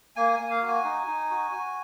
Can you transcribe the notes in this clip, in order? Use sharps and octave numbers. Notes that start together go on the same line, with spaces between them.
A#3 G#5
G#5
A#3
F5
F#4
G#5
D#4
D#4
F#4
F#4